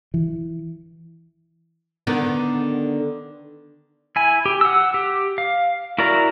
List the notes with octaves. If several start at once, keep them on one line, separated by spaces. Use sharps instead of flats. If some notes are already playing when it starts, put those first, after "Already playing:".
E3
D3 D#3 B3
E4 G#5
G4
F#5 E6
G4
F5
E4 F#4 A#4 D5 A#5